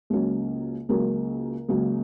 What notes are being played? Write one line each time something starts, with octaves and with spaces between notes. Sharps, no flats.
C#2 C#3 F#3 A#3 C#4
C#2 C#3 F#3 A#3 C#4 A#4
C#2 C#3 F#3 A#3 C#4